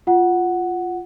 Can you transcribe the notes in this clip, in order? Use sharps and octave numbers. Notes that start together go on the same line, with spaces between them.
F4 F#5